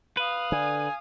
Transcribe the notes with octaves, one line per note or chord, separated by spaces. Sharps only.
B4 F5 D#6
D3 G#5